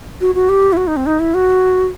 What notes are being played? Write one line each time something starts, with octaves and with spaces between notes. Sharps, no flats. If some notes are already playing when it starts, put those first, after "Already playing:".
F#4
F#4
G4
E4
F#4
D#4
C4
D#4
E4
F#4